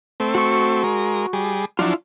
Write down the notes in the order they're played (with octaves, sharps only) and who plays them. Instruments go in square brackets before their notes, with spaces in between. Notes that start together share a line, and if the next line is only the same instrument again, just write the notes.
[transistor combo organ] A3 C4
[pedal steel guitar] F#4 C#6
[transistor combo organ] G#3 A#4
G3 G#4
[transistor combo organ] F3 F#3 D4 [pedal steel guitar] E4 F4